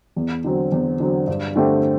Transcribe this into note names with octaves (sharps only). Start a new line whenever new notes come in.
E2
D3 F#3 C4
E2
D3 F#3 C4
G2
D3 A3 C4 G4